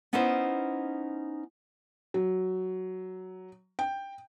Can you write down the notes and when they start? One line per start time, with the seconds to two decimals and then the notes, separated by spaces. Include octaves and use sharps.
0.13 B3 C#4 D#4 E4 B4 C5
2.14 F#3
3.79 G5